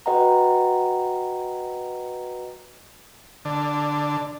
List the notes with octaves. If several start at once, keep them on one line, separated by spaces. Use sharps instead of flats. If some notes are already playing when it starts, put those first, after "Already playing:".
F#4 B4 D#5 F#5 G5 A#5
D3